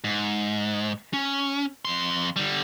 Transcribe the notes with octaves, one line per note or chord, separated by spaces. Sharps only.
G#2
C#4
F2 C6
D3 G3